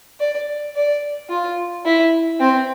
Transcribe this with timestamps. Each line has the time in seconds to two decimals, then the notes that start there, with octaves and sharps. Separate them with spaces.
0.20 D5
0.76 D5
1.30 F4
1.85 E4
2.40 C4